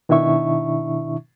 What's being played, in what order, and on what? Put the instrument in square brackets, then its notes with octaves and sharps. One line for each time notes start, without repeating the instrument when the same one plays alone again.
[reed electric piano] B2 D#3 D4 E4 E5 C#6